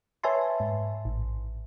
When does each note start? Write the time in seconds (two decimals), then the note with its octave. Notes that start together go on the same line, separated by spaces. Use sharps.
0.24 B4 C#5 E5 G#5 A5 C6
0.60 G#2
1.05 A1